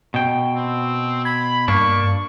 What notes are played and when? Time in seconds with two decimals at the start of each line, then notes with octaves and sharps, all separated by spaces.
0.14 B2 G5
0.56 C4
1.25 B5 G#6
1.68 G2 A#3 D4 C#6